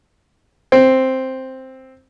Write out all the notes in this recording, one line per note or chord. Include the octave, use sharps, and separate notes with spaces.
C4